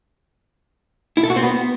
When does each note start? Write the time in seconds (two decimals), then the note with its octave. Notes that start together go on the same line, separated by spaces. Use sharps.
1.17 E4
1.23 A4
1.30 F#4
1.36 C4
1.43 B3